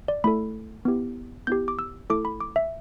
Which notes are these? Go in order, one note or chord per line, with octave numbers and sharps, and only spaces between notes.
D5
A3 E4 A4 B5
B3 E4 G4
B3 E4 G4 G6
D6
E6
A3 E4 A4 D6
B5
D6
E5